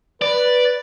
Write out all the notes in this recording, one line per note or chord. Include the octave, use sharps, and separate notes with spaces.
B4 D5